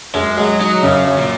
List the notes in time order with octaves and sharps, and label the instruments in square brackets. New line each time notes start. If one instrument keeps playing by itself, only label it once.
[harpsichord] F#2 [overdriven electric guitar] G#3
[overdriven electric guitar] F#3 [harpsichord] G#3
[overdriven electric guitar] F#3 [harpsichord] D#4
[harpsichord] F#2 [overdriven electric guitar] C#3
[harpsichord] F#2
[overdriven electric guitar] A#2